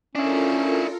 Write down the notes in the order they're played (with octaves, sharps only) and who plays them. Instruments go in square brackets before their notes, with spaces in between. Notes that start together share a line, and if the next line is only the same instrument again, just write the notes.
[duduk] C#4 [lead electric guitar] D4 E4 [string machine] F4 A4 A#4